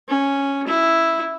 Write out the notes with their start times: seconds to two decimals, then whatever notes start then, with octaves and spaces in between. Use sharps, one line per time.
0.08 C#4
0.67 E4